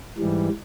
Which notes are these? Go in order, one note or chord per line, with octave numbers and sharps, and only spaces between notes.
G#2 E3 G3